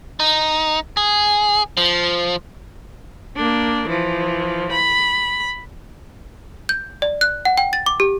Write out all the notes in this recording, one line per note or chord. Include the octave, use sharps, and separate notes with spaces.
D#4
G#4
F3
A#3 D4
E3 F3
B5
G6
D5
F#6
F#5
G5
A6
D6
G4